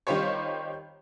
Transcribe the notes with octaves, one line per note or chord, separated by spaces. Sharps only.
D#3 G3 F4 G4 C5 C#5